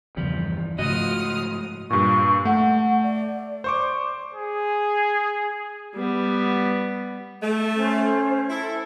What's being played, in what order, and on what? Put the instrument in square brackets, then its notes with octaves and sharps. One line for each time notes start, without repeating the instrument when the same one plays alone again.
[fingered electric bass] E2 G2 [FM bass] C#3 [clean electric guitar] F3 G3
[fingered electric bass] G#2 A3 [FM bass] C#3 [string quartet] F3 D#6 F6 [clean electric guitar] F#4 D#5
[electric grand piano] G2 A#2 [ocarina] C#6
[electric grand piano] A3 [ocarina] F#5
[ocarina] D5
[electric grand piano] C5 C#6 D6
[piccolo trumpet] G#4
[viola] G3 B3
[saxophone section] A3
[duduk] C#4 [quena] C5
[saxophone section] E4 [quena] A4